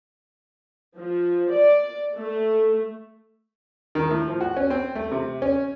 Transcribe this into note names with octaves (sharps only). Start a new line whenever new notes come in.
F3
D5
A3
D#3
A2
F3
F#4
C#4
C4
A3
C3
C#4